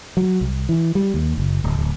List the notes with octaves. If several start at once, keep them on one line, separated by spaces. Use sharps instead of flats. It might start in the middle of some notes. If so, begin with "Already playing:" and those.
F#3
C2
E3
G3
D#2
F#1
D1
D1